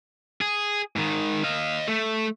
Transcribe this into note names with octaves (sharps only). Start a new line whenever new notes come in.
G#4
G#2 D#3
D#5 F5
A3